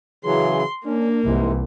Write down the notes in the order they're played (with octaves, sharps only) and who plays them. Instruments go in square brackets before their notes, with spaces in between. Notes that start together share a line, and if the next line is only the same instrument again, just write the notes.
[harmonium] C#3 E3 F#3 [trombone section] G#4 [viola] C6
[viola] A#3 [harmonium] C#4 [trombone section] D4
[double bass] C2 [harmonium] G#2 C3 G#3 [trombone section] D#3 E3